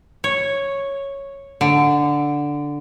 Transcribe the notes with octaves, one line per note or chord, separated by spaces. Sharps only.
C#5
D3